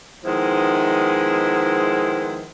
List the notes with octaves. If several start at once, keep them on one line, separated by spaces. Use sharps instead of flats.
D#3 F3 G#3 B3 E4